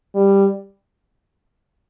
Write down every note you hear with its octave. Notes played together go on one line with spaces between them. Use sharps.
G3